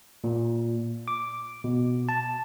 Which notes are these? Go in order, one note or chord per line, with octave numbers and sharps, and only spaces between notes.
A#2
D6
B2
A5